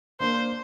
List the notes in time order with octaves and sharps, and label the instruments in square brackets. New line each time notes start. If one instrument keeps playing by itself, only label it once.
[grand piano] A#3 D4 [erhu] C5